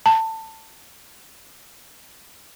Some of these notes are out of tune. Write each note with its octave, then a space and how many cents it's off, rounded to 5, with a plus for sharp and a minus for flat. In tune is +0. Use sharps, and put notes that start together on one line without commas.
A5 +20